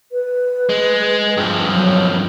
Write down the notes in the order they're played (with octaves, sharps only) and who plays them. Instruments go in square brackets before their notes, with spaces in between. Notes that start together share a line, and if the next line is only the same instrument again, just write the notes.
[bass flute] B4
[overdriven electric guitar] G#3
G2 F3
[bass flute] F#3